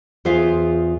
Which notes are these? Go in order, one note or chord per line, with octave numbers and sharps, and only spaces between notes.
E2 F4 G#4 C5 E5 F5